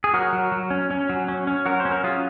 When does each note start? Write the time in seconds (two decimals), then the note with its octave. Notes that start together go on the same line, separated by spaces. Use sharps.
0.04 G#4
0.14 F#3 F#4 A#4
0.33 F#3
0.52 F#3
0.70 C#4
0.91 C#4
1.10 F#3
1.28 C#4
1.47 C#4
1.66 F#3 F#4 A#4
1.80 C5
1.85 C#4
1.91 A#4
2.04 F#3 F4 G#4